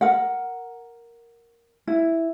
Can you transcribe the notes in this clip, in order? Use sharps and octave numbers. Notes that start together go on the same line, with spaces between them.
A#4 F#5
E4